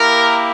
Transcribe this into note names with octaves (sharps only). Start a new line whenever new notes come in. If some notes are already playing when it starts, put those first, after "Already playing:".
Already playing: A#3 E4 G4 A#4